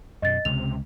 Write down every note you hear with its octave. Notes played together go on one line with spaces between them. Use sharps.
F#2 B2 D#5 A6
C#2 C3 F7